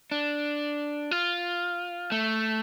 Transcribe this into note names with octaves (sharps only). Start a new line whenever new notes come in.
D4
F4
A3